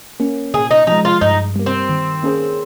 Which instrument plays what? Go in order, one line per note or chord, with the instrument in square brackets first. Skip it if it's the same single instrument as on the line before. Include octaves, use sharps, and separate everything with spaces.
[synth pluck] A#3 C#4
[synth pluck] A#2 [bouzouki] G#4
[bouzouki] D#4
[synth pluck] F3 G#3 [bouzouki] D#4
[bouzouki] F4
[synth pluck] G2 [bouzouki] D#4
[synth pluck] G3 A#3
[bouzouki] C4
[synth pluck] D#3
A#3 C#4 G#4 C5